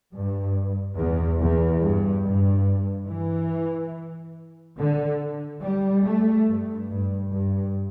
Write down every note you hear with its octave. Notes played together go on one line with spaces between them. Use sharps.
G2
E2
E2
G2
G2
E3
D3
G3
A3
G2
G2
G2